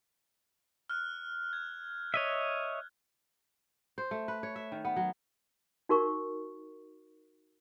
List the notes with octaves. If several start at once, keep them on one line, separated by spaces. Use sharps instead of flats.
F6 F#6
G#6
C#5 D#5 E5
C5
A3
B4
C#5
E5
D#3
B3
F#3
D#4 F#4 A#4 C#6